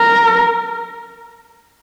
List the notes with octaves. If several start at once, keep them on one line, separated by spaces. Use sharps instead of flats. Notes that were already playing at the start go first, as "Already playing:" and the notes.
Already playing: A#4